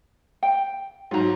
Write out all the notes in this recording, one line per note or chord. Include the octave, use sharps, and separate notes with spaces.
G5
G#2 F#3 F4 A#5